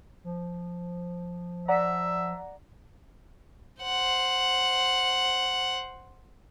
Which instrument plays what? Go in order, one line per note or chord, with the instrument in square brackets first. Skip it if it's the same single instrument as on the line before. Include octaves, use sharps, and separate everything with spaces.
[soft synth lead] F3
[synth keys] D5 F#5 A#5 [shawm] E5
[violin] C5 F#5